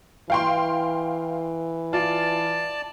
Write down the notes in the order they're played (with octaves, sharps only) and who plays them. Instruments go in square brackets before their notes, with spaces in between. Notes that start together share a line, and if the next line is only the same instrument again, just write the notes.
[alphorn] E3 [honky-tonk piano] F5 G5 C6
[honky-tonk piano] F4 [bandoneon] D5 A5